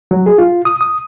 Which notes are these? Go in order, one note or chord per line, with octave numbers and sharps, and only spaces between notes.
F#3
G#4
F4
D#6
D#6